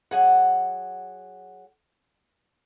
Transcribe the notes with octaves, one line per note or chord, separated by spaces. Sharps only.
F#3 G#4 F#5